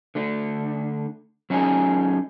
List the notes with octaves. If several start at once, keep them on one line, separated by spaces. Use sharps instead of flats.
D3 A3 D4
F#3 C#4 D#4 F4 G#4 G#5